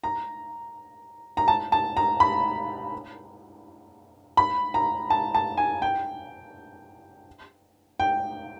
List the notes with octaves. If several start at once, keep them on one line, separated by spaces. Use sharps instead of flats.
A#5
A#5
A5
A5
A#5
B5
B5
A#5
A5
A5
G#5
G5
G5